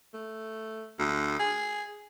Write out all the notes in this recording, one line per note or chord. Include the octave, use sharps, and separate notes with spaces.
A3
D2
G#4